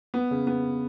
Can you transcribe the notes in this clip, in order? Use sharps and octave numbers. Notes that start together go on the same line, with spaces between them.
B3
C#3
B3